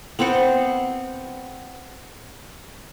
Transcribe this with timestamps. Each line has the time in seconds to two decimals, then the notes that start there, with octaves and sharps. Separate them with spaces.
0.19 B3 C4 C5 F#5